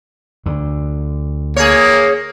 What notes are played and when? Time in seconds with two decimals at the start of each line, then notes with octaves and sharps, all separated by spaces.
0.46 D2 D3
1.56 A#3 G#4 C#5